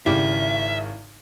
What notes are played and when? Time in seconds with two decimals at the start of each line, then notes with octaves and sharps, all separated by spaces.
0.06 G#1 C#3 E4 G4 D5 E5